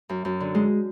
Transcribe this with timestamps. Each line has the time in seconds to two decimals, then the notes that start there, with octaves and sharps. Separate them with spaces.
0.09 F#2
0.25 F#2
0.40 D3
0.55 G#3